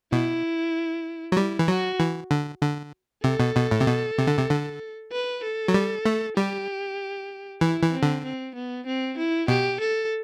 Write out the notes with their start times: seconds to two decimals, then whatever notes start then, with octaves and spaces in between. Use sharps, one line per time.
0.12 B2 E4
1.32 F#3
1.37 G3 E4
1.59 E3
1.68 F#3 F#4
2.00 E3
2.31 D3
2.62 D3
3.24 C3 A4
3.40 B2
3.56 B2
3.71 A2
3.80 C3
3.86 B2
4.18 C3
4.27 D3
4.37 C3
4.50 D3
5.12 B4
5.43 A4
5.68 F#3
5.74 G3
6.06 A3
6.37 G3 G4
7.61 E3 E4
7.82 E3
7.92 C4
8.03 D3
8.24 C4
8.55 B3
8.86 C4
9.18 E4
9.48 B2 G4
9.80 A4